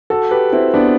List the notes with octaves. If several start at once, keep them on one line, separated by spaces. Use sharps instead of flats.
F#4 A4
G4 B4
C4 E4
B3 D4